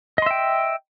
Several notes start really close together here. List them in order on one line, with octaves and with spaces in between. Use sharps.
D#5 C6 E5 G5